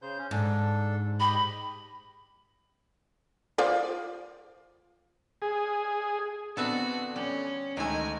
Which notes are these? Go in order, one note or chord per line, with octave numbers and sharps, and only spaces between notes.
C#3 C5 G6
C#4
G#2 D4 A4
G4 D#5 B5
F4 C5 D5
G#4
D3 B3 C4 F#4 A4 B4 E5
G3 C#4
D2 D#3 G#3 A3 G#5